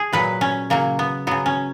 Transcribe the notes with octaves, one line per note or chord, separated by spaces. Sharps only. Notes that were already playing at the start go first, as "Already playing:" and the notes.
Already playing: G#4
A#2 F#3 B4
C#4
C#3 F#3 A#3
B3
C#3 F#3 B3
C#4